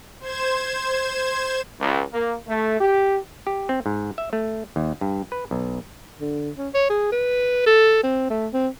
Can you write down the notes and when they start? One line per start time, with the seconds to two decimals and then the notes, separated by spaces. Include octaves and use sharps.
0.20 C5 G#6 E7
1.79 C#2
2.12 A#3
2.47 A3
2.80 G4
3.47 G4
3.69 C4
3.86 G#2
4.18 E5
4.33 A3
4.76 D#2
5.01 G2
5.32 B4
5.51 B1
6.21 D3
6.58 C#4
6.74 C#5
6.90 G#4
7.12 B4
7.66 A4
8.03 C4
8.30 A3
8.53 C4